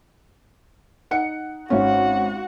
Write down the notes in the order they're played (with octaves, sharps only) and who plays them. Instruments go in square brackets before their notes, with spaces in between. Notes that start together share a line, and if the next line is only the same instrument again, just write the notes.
[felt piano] D#4 F#5 C#7
[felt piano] G#1 C#4 [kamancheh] F#4 F#5